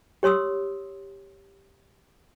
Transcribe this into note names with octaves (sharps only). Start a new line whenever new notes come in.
G4 C#5 C6 D#6 E6